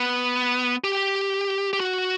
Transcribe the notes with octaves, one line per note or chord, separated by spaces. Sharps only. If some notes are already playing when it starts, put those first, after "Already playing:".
Already playing: B3
G4
G4
F#4